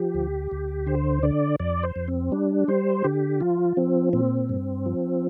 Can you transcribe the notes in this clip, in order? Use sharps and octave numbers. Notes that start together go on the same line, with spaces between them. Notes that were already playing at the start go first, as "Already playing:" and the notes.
Already playing: F3 G4
D2
D2
D3 C5
D3 D5
F2 D5
C5
F2
C4
G3 D4
G3 C5
D3 G4
F3 F4
F3 C4
A#2 C4
G2
F3